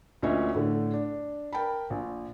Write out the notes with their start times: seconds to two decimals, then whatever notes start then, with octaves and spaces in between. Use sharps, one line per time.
0.23 D2 A#2 C#4 C#5 D#5 E5
0.54 A2 D3 A3
0.93 D4
1.53 A#4 G5 A5 B5
1.90 A#1